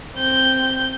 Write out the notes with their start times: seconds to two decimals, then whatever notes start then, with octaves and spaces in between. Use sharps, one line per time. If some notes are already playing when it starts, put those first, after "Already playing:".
0.16 C4 G6